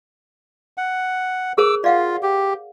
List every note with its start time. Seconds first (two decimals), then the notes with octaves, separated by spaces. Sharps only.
0.78 F#5
1.58 G#4 A#4 C5 D6 E6
1.84 F4 D5 F5 F#5
2.23 G4